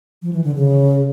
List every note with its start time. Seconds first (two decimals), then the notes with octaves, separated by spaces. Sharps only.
0.22 F3
0.33 E3
0.44 D3
0.55 C#3